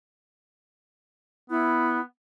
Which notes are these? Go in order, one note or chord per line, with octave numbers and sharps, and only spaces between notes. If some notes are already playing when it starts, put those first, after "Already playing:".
B3 E4